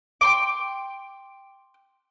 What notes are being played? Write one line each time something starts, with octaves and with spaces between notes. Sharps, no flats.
G5 C6 D6